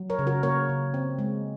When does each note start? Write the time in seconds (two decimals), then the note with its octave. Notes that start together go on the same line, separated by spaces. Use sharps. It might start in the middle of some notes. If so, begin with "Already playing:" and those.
Already playing: F#3
0.10 A#4 C#5
0.19 C#3
0.27 F#4 A#4
0.43 A#3 A#4 C#5
0.69 C#3
0.94 C4
1.19 G#3